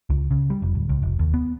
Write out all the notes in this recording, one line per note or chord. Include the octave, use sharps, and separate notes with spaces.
C#2
C#3
G3
F1
D1
C#2
F1
D#2
B3